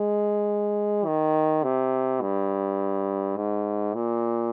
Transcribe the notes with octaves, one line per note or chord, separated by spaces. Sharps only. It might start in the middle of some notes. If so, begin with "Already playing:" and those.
Already playing: G#3
D#3
C3
G2
G#2
A#2